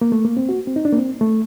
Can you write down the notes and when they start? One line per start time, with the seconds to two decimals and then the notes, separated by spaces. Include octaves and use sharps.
0.01 A#3
0.12 A3
0.25 A#3
0.37 C4
0.49 F#4
0.67 C4
0.76 D#4
0.85 D4
0.92 A#3
0.97 C4
1.21 A3